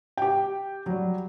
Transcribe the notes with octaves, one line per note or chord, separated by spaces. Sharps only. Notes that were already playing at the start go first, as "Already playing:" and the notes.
G4 G5
F#3 G3